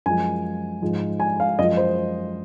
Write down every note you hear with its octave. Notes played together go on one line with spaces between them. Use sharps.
F#2 F3 G#3 G#5
G#2 F3 G#3
G#5
F5
F#2 F3 G#3 D#5
C5